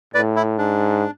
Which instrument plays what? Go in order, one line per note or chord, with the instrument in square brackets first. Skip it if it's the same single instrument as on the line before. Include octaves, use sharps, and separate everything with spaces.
[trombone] A2 [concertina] B4 D5
[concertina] E4
[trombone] G#2 [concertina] D4